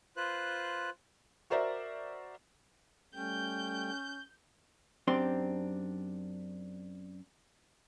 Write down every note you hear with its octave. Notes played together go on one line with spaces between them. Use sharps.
F4 B4 C5 F#6
F#4 A#4 C5 D5 E5
G3 A3 C#4 G5 G6
F#2 C4 D4 G4 C6